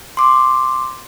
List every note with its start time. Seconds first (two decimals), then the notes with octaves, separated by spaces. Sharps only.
0.17 C6 D6